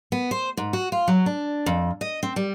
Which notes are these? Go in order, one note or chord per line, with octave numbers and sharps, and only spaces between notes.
B3
C5
G#2
F#4
F4
F#3
D4
F2
D#5
C4
G3